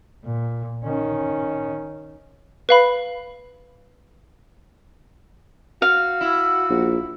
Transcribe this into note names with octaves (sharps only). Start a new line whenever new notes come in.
A#2
D#3 C#4
B4 F5 B5
F#4 F5
E4
A#1